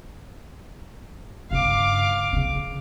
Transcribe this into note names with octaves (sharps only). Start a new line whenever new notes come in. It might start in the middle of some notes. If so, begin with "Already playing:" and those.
G2 C#3 F5 D6
C#3 C#4